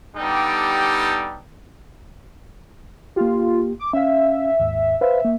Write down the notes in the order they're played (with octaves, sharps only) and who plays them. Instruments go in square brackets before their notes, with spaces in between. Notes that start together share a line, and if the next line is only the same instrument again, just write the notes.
[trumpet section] G3 B3 D4 D#4 G4 A4
[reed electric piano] A#3 G4 [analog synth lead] F4
[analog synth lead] D6
[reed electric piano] C#4 F5 [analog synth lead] E5
[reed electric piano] D#2 G#2
[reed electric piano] B4 C5 F5 [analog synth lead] E5
[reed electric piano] A#3